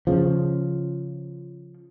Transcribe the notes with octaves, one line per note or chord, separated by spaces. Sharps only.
C#3 F3